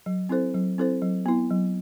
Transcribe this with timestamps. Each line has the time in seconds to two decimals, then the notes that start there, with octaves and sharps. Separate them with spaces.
0.06 F#3
0.29 C4 E4 A4 C5
0.55 F#3
0.78 C4 E4 A4 C5
1.02 F#3
1.26 B3 E4
1.51 F#3